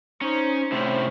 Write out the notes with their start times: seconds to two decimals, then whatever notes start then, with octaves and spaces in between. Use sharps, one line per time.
0.21 C#4 D#4 C5
0.72 A2 C3 C#4 E4 C5